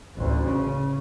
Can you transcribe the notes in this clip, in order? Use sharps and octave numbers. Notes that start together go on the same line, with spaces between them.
A1 D2
C#3